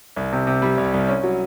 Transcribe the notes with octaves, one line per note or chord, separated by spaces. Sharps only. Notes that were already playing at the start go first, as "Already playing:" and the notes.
C2
C3
C3
G3
C2
C2
C#4
F#3